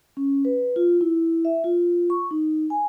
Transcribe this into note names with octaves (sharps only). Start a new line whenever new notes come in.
C#4
B4
F4
E4
E5
F4
C#6
D#4
G#5